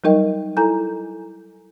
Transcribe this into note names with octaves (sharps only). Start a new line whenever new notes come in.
F#3 G3 D#4 A#4 D#5 G5
E4 A4 G#5 A#5 G6